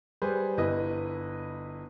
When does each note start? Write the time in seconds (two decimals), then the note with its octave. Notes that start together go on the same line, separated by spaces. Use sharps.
0.22 G3 G#4 B4 C5
0.57 G1 E4 B4 D#5 D#6